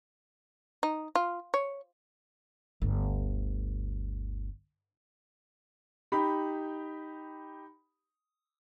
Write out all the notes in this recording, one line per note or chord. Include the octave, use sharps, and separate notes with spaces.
D#4
F4
C#5
G1 D2
D#4 G4 B5